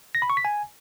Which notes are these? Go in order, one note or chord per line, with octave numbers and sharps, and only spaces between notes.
A#6
B5
C#6
B6
G#5